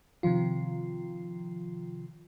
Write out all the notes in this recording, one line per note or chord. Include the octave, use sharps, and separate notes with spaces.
C3 D#3 F3 F4